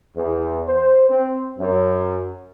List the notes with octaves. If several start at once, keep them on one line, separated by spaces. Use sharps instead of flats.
E2
C5
C4
F#2